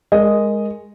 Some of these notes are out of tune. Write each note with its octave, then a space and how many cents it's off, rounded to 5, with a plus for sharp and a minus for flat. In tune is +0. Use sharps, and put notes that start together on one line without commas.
G#3 +0 A#4 +0 D#5 +0